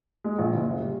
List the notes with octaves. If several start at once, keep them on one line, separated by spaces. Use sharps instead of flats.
G#3
A#1
F#1
G3